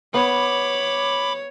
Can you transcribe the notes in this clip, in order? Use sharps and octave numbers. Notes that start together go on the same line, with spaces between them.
B3 C#5 B5 D6